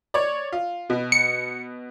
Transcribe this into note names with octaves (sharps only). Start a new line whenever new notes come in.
C#5 D5
F4
B2
C#7